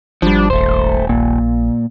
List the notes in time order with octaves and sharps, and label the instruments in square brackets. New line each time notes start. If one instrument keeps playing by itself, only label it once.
[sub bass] G#1 [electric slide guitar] F3 G3 [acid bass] D4
[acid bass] D#1 [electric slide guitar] A3 C5
[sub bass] A#1 [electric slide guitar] A#2